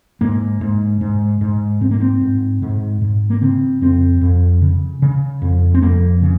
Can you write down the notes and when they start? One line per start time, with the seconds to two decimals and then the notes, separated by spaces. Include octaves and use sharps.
0.21 G#2 A#3
0.61 G#2
1.01 G#2
1.41 G#2
1.81 G#2 C4
1.91 A#3
2.00 C4
2.21 G#2
2.62 G#2
3.01 G#2
3.30 A#3
3.41 C#3 C4
3.81 F2 C4
4.21 F2
4.61 C#3
5.02 C#3
5.42 F2
5.74 C4
5.82 F2 A#3
6.22 C#3